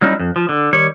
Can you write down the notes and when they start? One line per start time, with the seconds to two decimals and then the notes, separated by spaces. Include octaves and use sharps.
0.01 F#3 G3 C#4 D#4 E4
0.19 F2
0.36 F3
0.49 D3
0.73 D#3 G3 C#5